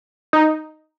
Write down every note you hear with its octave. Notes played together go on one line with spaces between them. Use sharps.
D#4